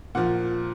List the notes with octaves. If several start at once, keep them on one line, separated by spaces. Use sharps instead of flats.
A#2 F3 F#5